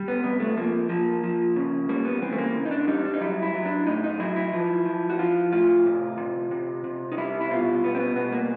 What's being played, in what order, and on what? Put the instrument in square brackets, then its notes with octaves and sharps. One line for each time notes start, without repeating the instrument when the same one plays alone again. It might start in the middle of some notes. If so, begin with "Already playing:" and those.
Already playing: [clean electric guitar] G3
B3
C3 B3
A3
F3 A#3
F3 A#3
F3
C#3
G3 A#3
B3
E3 C4
A3
A#3
C#3
D#4
D4
G3 D#4
D4
D#4
F#3 E4
E4
F#3
D4
A2 D#4
D#4
F#3 E4
E4
F3
F3
F#4
F3 F4
A2 F4
C3
C3
C3
C3
D#4
G3 E4
E4
B2 F4
G3 B3
C4
B3
B2 B3
A#3